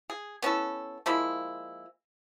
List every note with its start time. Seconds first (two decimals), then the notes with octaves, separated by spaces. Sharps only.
0.10 G#4
0.42 B3 C#4 E4 A4
1.06 F3 G#3 A#3 E4